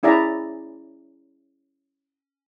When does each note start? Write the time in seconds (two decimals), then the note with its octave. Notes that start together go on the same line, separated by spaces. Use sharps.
0.03 C#4 E4 G#4 D5 E5 A#5